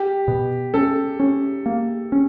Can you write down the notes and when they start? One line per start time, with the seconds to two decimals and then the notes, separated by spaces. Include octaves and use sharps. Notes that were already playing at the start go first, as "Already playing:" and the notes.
Already playing: G4
0.28 B2
0.74 C#4 A4
1.20 C#4
1.66 A#3
2.12 C#4